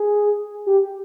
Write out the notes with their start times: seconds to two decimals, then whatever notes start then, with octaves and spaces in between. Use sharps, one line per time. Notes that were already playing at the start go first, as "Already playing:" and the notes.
Already playing: G#4
0.66 G4